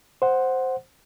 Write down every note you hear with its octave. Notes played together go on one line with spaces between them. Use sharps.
C5 F#5